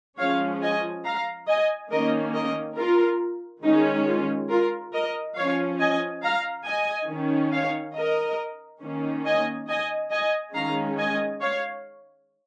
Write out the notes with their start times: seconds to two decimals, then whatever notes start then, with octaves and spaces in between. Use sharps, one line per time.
0.18 F3 G#3 C#4 C#5 F5
0.62 D#5 G#5
1.05 F5 A#5
1.48 D#5 G#5
1.91 D#3 A#3 C#4 A#4 D#5
2.34 A#4 D#5
2.77 F4 A#4
3.64 D#3 G#3 C#4 D#4
4.07 F4
4.50 F4 A#4
4.93 A#4 D#5
5.36 F3 C#4 C#5 F5
5.80 D#5 G#5
6.23 F5 A#5
6.66 D#5 G#5
7.09 D#3 C#4
7.52 C#5 F5
7.95 A#4 D#5
8.82 D#3 A#3 C#4
9.25 D#5 G#5
9.68 D#5 G#5
10.11 D#5 G#5
10.54 D#3 G#3 C#4 F5 A#5
10.98 D#5 G#5
11.41 C#5 F5